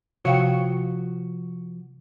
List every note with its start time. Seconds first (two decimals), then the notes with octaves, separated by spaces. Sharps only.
0.25 C3 F3 F#4 C#5 F5 G5